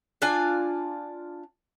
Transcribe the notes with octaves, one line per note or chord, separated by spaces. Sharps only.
D4 F4 D5 G#5